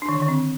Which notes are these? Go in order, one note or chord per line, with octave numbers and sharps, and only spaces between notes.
D4
D#3
D3
D#3
C4